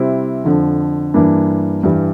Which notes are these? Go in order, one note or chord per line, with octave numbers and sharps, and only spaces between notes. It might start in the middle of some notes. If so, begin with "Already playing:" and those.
Already playing: C3 G3 C4 E4
F2 D3 F3
G2 E3 A#3 D4
G2 E3 G3